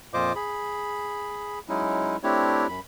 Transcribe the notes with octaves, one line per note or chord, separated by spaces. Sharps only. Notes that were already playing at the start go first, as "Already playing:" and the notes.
F2 A#2 F4 C5 D#5 D6
G#4 B5
F#3 G#3 C#4 D#4 E4
A3 C4 D4 E4 G4 C#5
F#2 B5